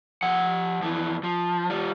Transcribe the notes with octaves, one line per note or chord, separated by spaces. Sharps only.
F3 F#5
F2 E3
F3
G3 F4